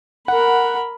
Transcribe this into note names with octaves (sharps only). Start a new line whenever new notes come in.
A#4 F#5 B5